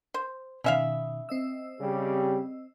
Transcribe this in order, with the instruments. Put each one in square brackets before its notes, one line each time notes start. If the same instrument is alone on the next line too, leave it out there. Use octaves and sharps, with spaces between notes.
[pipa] C5
[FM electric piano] B2 D#3 [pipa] C#4 E5 F5
[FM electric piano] C4 D#5 E6
[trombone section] C#3 G3 G4